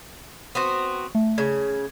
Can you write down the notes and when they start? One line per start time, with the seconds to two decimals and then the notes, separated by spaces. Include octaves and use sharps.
0.55 B3 C4 F#4
1.15 A3
1.38 C#3 G#6